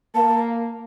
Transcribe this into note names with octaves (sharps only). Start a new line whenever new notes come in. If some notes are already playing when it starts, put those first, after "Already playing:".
A#3 A5